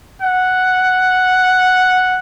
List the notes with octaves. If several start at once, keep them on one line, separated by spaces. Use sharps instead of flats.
F#5